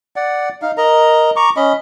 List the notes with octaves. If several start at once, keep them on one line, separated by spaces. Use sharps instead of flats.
D5 F#5
D#4 F5
A#4 D#5 A#5
A#5 C#6 D6
C#4 D#5 B5